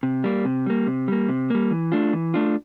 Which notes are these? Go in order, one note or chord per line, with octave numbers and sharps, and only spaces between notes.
C3
G3 A#3
C3
G3 A#3
C3
G3 A#3
C3
G3 A#3
E3
A3 D4 F4
E3
A3 D4 F4